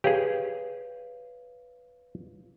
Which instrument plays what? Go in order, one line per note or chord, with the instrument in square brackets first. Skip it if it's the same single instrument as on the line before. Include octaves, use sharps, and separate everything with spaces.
[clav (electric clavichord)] G4 G#4 [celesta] B4 C#5 F5